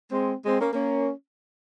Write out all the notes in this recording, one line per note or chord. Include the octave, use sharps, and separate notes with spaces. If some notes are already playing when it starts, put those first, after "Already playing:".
G#3 C4
G#3 C4
A#3 C#4
A#3 C#4